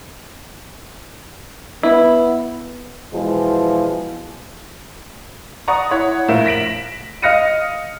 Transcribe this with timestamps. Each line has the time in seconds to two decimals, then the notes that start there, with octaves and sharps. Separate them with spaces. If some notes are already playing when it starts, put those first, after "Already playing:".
1.83 B3 E4
3.11 B2 E3 F3 G#3
5.68 D5 F#5 A#5 C#6 D#6
5.91 E4 C#5 F#5
6.28 A#1 A2 A#4 E5 F5 E7
6.46 A#6 B6 D7 E7 F#7
7.22 D#5 F5 F6 A#6 C#7 D#7